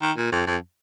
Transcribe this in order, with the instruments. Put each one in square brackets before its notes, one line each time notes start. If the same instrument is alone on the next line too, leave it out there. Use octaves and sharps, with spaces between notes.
[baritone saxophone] D#3
A#2
F2
F2